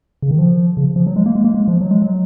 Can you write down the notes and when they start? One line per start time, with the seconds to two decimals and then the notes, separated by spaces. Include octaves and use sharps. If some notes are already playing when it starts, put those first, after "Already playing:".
0.22 C#3
0.31 D#3
0.39 F3
0.77 C#3
0.96 F3
1.07 F#3
1.16 G#3
1.26 A#3
1.35 G#3
1.44 A#3
1.54 G#3
1.68 F3
1.81 F#3
1.91 G#3
2.02 F#3